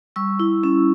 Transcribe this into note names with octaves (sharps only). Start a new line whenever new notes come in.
G3 C#6 E6
E4
C#4